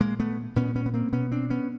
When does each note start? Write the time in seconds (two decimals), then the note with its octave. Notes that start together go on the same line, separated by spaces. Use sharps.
0.01 A#2 G#3 A#3
0.20 A3 B3
0.56 A#2 B3 C#4
0.76 B3 C#4
0.86 B3
0.94 A#3 C4
1.12 B2 B3 C#4
1.32 C4 D4
1.50 B3 C#4